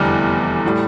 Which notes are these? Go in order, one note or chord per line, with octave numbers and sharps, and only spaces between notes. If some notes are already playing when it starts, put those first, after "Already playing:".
Already playing: F1 E2 D3 G3 F6
A2 G3